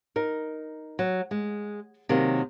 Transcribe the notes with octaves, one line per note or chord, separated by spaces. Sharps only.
D#4 A#4
F#3
G#3
C3 D#3 F#3 A#3